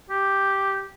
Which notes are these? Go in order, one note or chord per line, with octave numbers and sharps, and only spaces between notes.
G4